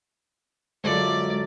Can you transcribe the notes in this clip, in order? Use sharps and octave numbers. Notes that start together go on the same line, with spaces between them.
F#2 D3 G#3 F4 A4 D5